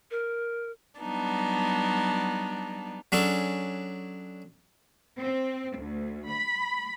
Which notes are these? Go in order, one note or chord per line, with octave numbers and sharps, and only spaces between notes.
A#4
F#3 G3 B3 D4 D#4
F#3 C#4 D4 G#4 A4
C4
D2
B5